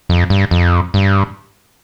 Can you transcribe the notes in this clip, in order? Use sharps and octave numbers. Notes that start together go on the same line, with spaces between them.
F2
G2
F2
G2